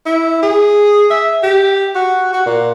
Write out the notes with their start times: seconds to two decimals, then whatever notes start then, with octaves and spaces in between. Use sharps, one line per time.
0.06 E4
0.43 G#4
1.10 E5
1.43 G4
1.95 F#4
2.33 F#4
2.46 A#2